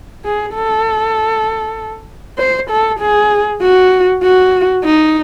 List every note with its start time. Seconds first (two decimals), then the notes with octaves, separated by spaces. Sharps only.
0.25 G#4
0.54 A4
2.38 C5
2.70 A4
3.00 G#4
3.61 F#4
4.23 F#4
4.84 D#4